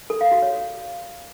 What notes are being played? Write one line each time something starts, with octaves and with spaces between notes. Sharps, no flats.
A4
F5
F#4
C#5